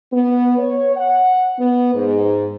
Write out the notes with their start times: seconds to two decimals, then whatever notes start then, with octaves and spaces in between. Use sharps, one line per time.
0.13 B3
0.59 C#5
0.97 F#5
1.59 B3
1.95 G#2